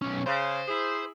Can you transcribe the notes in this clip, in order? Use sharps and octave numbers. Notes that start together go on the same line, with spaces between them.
B1 C#4
C#3 C5
E4 G#4